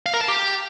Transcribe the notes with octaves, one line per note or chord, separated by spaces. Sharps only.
F5
A#4
A5
G4